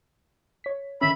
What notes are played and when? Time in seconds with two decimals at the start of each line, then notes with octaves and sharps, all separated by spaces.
0.64 C#5 B6
1.01 D3 D#3 C#4 E5 B5